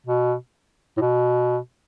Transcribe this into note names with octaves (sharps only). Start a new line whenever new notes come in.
B2
A2
B2